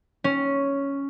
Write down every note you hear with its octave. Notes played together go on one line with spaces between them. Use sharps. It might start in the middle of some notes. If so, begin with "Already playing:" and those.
C#4